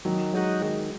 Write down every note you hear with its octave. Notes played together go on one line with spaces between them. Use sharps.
D#3 F#3
F#3 G#3 D#4 F#4
D#3 G#3